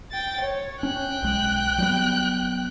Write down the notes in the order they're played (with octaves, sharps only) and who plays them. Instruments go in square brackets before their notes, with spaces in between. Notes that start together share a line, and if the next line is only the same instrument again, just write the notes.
[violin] G5 A6
C#5
[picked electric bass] C#4 [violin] G5 F#6
[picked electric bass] B1 G#3
F#3 G3 B3